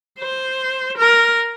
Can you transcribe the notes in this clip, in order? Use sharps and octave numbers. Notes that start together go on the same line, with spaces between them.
C5
A#4